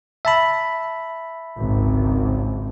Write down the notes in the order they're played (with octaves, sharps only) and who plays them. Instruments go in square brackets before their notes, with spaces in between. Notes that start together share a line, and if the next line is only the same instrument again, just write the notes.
[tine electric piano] E5 A5 B5
[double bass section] G#1 C#2 G#2